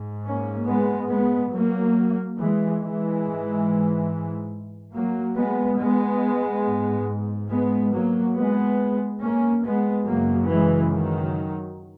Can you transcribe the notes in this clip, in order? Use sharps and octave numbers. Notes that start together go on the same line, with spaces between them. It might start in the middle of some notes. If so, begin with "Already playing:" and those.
Already playing: G#2
A#3 C#4
G#3 B3
G#3 B3
F#3 A#3
E3 G#3
E3 G#3
G#2
F#3 A#3
G#3 B3
G#3 B3
G#2
G#3 B3
F#3 A#3
G#3 B3
A#3 C#4
G#3 B3
F#2 C#3 F#3 A#3
E3 G#3
D#3 F#3